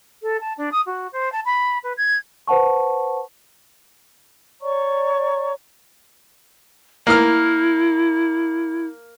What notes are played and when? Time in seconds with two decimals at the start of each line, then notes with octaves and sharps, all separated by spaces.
0.22 A4
0.41 A5
0.58 D4
0.72 D#6
0.86 F#4
1.12 C5
1.32 A5
1.45 B5
1.84 B4
1.97 G#6
2.48 B4 C5 F#5 A5 C#6
4.61 C#5 D5 A#5 C#6
7.07 A#3 E4 F6